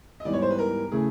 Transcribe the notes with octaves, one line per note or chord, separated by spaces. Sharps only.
D#5
G#2 E3 G3 B3 D5
C#5
C5
B4
A#4
C#3 E3 A3 G#4